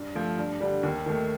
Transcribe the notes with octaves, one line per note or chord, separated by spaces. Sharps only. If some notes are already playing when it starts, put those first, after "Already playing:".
Already playing: G2
F3 A3
G2
D3 G3
D#2
D#3 A3